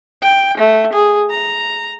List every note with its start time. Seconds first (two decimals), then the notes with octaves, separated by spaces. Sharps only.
0.23 G5
0.58 A3
0.93 G#4
1.31 A#5